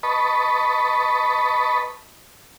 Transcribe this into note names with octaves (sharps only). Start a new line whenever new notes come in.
B4 D#5 A5 B5 C#6